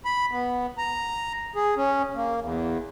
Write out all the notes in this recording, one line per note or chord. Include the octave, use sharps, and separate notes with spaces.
B5
B3
A#5
G#4
C#4
A#3
E2